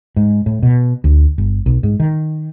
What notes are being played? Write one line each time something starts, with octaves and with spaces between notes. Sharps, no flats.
G#2
A2
B2
D2
G1
B1
G#2
D#3